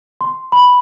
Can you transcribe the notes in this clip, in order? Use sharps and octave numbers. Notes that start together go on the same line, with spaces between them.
C6
B5